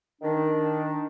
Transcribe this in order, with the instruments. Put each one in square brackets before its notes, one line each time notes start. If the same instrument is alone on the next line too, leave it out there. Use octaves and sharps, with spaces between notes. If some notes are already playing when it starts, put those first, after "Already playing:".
[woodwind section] D#3 D4